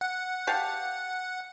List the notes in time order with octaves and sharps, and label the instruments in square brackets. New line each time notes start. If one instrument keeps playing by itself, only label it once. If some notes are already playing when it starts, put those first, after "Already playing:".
[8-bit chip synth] F#5
[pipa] G4 F5 A5